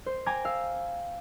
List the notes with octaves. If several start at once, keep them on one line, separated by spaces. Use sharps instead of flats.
C5
G5 G#5 A#5 D6 G#6
F5 E6 F6